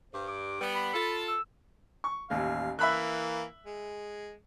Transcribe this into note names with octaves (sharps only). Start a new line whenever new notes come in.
G2 C5
D6
G3 B3
B5
F4 A4
E6
C#6
A1 D#2 F5
E3 A#3 E5 B5 F#6
G#3